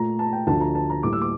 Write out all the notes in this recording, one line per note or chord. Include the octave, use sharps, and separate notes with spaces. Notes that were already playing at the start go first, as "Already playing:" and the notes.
Already playing: A#2 A3 A#5
A5
G5
D2 D3 F3 A5
A#5
A5
A#5
A2 G3 A#3 D6
E6
D6